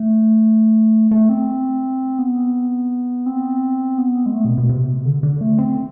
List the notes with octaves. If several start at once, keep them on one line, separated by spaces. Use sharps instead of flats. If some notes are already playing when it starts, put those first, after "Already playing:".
Already playing: A3
A3
C4
B3
C4
B3
G#3
A3
B2
B2
C3
D3
D3
A3
C4